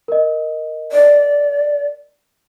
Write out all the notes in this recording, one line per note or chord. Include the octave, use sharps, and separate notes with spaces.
A#4 D#5
D5